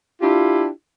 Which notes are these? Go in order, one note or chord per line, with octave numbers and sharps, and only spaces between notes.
D4 E4 F4 G4